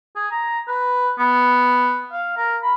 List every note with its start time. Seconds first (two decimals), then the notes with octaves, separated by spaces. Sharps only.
0.16 G#4
0.31 A#5
0.68 B4
1.19 B3
2.12 F5
2.37 A#4
2.63 B5